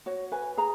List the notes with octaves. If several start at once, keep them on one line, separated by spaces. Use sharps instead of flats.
F#4 C#5
B4 G#5
G#4 A#5